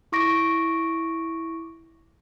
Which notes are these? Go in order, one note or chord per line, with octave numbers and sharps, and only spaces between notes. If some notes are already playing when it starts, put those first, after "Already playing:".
E4 C#6 D6 A#6 D7